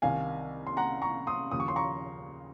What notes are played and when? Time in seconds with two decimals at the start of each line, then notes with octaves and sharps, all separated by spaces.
0.02 C2 C3 D#3 F5 G#5
0.67 C6
0.77 F#5 A#5
1.02 A#5 C#6
1.27 C6 D#6
1.51 D#2 C#3 F3 D#6
1.60 C#6
1.68 C6
1.76 A#5 C#6